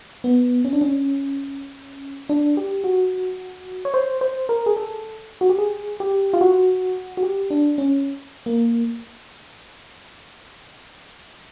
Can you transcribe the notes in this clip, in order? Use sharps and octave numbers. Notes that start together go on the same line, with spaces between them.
B3
C#4
D4
C#4
D4
G4
F#4
C#5
C5
C5
A#4
G#4
A4
F#4
G4
G#4
G4
F4
F#4
F#4
G4
D4
C#4
A#3